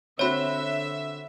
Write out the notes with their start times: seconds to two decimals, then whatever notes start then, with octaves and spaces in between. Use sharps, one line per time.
0.19 D3 C4 F#4 C#5 E5 B5